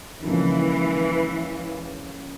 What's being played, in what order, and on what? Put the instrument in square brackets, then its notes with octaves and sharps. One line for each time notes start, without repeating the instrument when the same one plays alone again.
[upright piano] C#2 C#3 F3 A#3 D#4 [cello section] E3